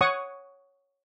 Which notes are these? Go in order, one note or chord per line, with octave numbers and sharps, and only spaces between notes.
C#5 F#5 C#6 D#6